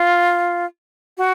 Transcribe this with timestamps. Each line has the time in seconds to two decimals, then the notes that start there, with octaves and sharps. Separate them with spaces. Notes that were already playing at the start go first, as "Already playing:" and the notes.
Already playing: F4
1.18 F#4